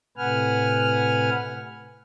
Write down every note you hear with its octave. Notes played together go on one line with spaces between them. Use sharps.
A2 C3 B4 F#5 G#5 F6